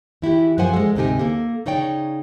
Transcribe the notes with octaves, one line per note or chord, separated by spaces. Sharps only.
E3 E4 F#4 G4
F#2 F3 G4 C5 F#5 G#5
G#3 A4
D2 G#2 C3 D#4 G4 G#5
A#3 A4
C#3 D#4 C#5 D5 G5